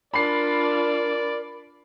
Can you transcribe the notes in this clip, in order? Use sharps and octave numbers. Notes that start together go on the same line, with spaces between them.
D4 F4 A#4 D5 B5 C7